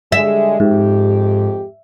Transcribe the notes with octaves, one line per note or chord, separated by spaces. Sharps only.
D3 G3 G#3 E5
F2 G#2 G#3 G4